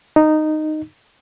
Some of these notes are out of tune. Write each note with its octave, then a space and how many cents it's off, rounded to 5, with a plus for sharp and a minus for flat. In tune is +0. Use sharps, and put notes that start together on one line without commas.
D#4 -10